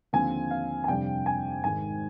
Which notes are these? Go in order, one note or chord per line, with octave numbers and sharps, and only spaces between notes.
D#2 D3 F3 C4 G#5
F5
G#5
F2 C3 G3 D4 G5
G#5
G#1 G#2 D#3 G#5